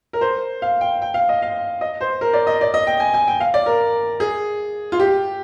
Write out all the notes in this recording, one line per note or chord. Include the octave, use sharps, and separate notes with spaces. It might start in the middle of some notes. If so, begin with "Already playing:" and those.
A#4
C5
F5
G5
G5
F5
D#5
F5
D#5
C5
A#4
D5
D#5
D5
D#5
G5
G#5
G#5
G5
F5
D5
A#4
G#4
F4
G4